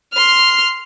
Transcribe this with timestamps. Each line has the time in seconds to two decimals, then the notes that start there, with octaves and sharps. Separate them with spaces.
0.13 C6 F6